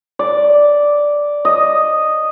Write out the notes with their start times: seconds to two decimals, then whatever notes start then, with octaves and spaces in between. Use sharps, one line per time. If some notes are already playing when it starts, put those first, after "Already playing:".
0.19 D5
1.45 D#5